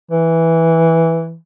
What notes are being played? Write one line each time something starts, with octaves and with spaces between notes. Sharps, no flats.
E3